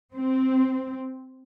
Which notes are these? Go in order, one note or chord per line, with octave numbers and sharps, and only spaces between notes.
C4